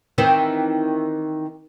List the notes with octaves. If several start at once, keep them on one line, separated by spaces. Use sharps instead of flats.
D#3 E3 C4